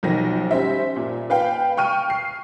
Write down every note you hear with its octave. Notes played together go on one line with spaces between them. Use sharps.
B1 D#3 F3 A#6
G3 C#4 C5 E5
A#2
B4 F5 G5
G5 C#6 F6 D#7
C7